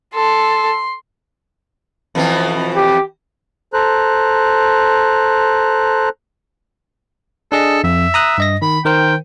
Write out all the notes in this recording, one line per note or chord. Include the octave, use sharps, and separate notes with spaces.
A4 C6
F2 B2 E3
G4
A4 C5 A#5 F#6
D4 G#4 A4 D#5
F2 E5
A#5 D#6 F#6
G2 D#5 A#6
D#3 B5
D#3 A#4 C5 G5